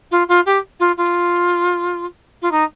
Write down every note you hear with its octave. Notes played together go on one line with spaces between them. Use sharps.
F4
F4
G4
F4
F4
F4
D#4